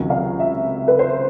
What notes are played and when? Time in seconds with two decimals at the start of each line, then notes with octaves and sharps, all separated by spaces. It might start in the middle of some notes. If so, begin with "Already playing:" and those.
Already playing: C#2 C3 D#3 F#3
0.10 F5
0.40 E5
0.88 B4
0.99 C5